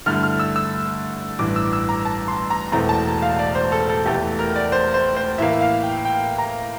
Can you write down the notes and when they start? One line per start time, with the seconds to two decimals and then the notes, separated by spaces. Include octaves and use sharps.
0.06 G2 D3 A3 E4 F6
0.23 F6
0.39 E6
0.56 E6
1.39 A1 G2 E3 D6
1.56 E6
1.73 E6
1.89 A#5
2.05 A5
2.28 C6
2.50 A#5
2.72 E1 E2 E3 A3 C4 A#5
2.89 A5
3.22 F5
3.39 D5
3.55 C5
3.72 A4
3.89 A4
4.05 F1 E2 E3 A3 G4
4.39 A#4
4.56 D5
4.72 C5
4.94 C5
5.16 C5
5.38 A2 E3 A#3 E5
5.61 F5
5.83 G5
6.05 G5
6.38 A#5